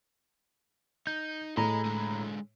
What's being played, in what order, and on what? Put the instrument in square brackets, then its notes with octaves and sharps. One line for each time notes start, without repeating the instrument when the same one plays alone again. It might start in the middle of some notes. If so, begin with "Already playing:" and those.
[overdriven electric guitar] D#4 [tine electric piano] G6
[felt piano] A2 [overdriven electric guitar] G#4 D#5 [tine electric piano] A#5 B5
[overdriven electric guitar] D3 G#3